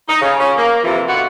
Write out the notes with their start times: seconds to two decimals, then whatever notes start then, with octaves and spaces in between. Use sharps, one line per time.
0.08 D#4
0.21 C#3
0.39 C#4 F4
0.56 A#3
0.83 F2 C3 E3 F3 F4
1.07 B2 D3 F4 F#4 F#5